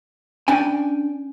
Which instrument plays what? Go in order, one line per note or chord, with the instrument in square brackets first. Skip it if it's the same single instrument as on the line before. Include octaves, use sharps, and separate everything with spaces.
[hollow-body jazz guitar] C#4 D4 G5 G#5